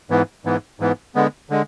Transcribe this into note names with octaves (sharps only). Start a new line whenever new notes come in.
G#2 E3 B3
G#2 E3 B3
G#2 E3 B3
D3 G#3 B3
D3 G#3